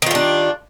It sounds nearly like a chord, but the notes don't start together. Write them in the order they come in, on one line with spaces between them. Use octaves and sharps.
D#3 F4 G3 D4